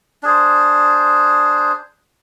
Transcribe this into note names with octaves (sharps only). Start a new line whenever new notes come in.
D4 G#4 C5